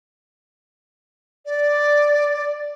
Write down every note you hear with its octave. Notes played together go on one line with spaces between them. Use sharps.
D5